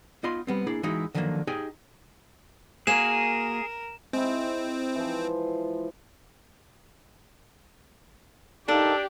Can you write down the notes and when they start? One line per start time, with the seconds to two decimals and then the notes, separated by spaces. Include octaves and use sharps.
0.23 B3 D#4 F4 D#5 B5 C6
0.47 G3 B3 C4
0.67 A#3 D4 E4 G#4
0.83 E3 G#3 D#4 E4 F#4
1.15 D3 D#3 F3 F#3 A3 A#3
1.47 D#4 G4 G#4 D#5 G5 G#5
2.87 A#3 F#4 G#4 A#4 G#5 E7
4.13 G#3 C4 E4
4.96 E3 F3
8.68 D4 D#4 G4 A4 A#4 F5